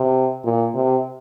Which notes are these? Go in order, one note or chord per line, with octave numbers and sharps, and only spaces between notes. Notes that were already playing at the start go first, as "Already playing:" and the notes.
Already playing: C3
A#2
C3